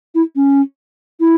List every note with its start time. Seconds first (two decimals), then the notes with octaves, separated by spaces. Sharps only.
0.15 E4
0.36 C#4
1.20 E4